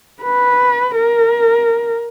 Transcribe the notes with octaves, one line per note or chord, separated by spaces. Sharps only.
B4
A#4